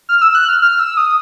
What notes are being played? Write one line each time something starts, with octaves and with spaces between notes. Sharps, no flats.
F6
E6
F#6
F6
F6
E6
D#6